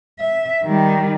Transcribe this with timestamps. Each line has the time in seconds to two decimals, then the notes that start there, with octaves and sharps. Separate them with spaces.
0.19 E5
0.64 D#3 G3